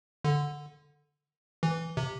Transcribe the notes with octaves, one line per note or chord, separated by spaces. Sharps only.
D3
E3
C3